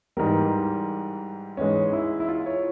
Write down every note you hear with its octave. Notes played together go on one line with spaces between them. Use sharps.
G#2 E3 G3 A#4
G#2 E3 G#3 C#4
E4
E4
F4
C#5